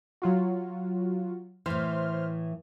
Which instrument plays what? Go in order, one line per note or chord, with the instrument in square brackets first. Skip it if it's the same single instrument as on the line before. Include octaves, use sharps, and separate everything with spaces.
[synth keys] F#3 F4 F#4
[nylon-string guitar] A2 E3 [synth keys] C5 C6 F6